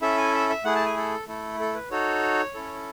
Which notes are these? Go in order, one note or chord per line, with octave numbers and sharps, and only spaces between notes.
C#4 E4 A4 E5
G#5
E5
E5
A3 E4 G#4 F#5
A5
G#5
A4
A3 E4 A4
A4
B4
D#4 F#4 A4 C#5
C#4 E4 A4